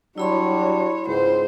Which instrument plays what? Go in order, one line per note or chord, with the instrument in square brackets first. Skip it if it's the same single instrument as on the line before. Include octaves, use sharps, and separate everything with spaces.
[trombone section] F#3 G3 D4 [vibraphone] E4 B5 C6 [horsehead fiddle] F#4 C#5
[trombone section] C#2 G#2 [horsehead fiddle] C5